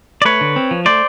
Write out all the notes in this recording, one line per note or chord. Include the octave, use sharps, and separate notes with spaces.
D5
A3 B4 C#5
D3
C4
F3
A3 C5 D5